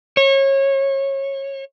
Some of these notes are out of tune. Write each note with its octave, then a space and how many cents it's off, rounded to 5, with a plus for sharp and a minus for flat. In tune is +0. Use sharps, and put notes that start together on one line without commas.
C#5 -25